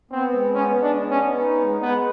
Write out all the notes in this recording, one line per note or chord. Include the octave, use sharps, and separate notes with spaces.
B3 C4
G#3
B3 C#4
G#3
D4
B3
C#4
B3
D#4
G#3
G#3 B3